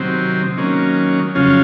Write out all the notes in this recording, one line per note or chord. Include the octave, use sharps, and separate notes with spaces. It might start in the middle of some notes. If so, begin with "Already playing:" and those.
Already playing: C3 D#3 F#3 C4
D#3 F#3 A#3 C#4
F2 C#3 F#3 C#4 F4